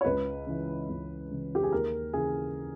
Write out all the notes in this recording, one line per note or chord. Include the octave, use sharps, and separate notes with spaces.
C#5
C#2 B4
C#3 E3
C#2
C#3 E3
G4
G#4
D#2 A#4
C#3 E3 G#4